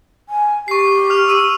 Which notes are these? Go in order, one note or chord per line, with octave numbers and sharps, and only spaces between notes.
G#5
G4 C#6 C7
F6 F7
E6 D#7